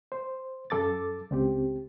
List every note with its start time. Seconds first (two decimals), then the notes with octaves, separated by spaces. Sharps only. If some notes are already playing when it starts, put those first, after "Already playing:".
0.12 C5
0.70 F#2 A4 D6 A6
1.31 C#2 C4 G4